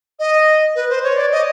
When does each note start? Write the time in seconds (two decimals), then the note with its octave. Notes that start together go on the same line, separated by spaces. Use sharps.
0.19 D#5
0.76 B4
0.89 C5
1.03 C#5
1.17 D5
1.32 D#5